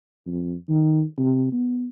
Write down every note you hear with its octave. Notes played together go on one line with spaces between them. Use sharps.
F2
D#3
C3
B3